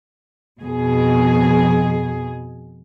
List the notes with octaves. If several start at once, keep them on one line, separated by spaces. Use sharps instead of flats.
F2 B2 G#4